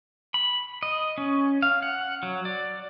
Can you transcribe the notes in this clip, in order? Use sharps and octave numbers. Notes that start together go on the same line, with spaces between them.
B5
D#5
C#4
F5
F#5
F#3
D5